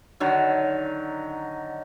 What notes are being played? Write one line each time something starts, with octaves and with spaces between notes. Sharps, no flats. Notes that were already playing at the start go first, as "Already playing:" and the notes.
D3 D#3 F#3